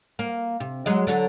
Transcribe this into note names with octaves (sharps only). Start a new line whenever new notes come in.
A#3
C3
F#3 G#3 D#5
D3 F#3 A4